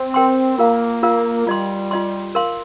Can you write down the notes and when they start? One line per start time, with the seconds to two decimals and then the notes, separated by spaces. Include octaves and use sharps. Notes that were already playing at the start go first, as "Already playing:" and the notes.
Already playing: C4
0.14 A#4 G5 C6
0.59 A#3 F4 A#4 F5
1.03 F4 A#4 F5
1.47 G3 F4 D#5 C6
1.91 F4 D#5 C6
2.35 A#4 F5 C6